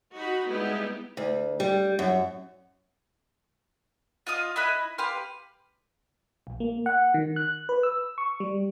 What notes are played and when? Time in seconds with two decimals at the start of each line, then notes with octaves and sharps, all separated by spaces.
0.13 D#4 F#4 B5
0.46 G3 G#3 B3 D#4 E4 G4
1.17 D2
1.60 G3
1.99 F#2
4.27 F4 D#5 F5 D#6
4.56 E4 D#5 B5 F#6
4.98 G4 B4 F5 C6
6.47 A#1
6.60 A#3
6.86 F#5
7.14 D#3
7.36 F#6
7.69 B4
7.83 E6
8.18 C#6
8.40 G3